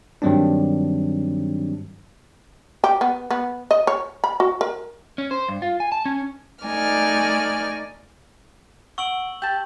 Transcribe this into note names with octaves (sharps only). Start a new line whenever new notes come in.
G2 D#3 F#3 G3 C4 D4
G4
B3
B3
D#5
C#5
B5
F#4
A#4
C#4
C5
G2
F4
G#5
A5
C#4
A3 D#4 D5 G#5 F6
F#5 C#6 E6 D7 F#7
G4 A5 G6 A6